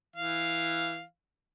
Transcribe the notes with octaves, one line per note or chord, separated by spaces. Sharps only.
E3 F5